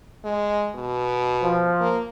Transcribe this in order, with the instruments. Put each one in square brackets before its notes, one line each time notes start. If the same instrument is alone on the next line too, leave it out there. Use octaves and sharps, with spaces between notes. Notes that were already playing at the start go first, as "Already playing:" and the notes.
[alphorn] G#3
B2
[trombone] F3
[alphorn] A#3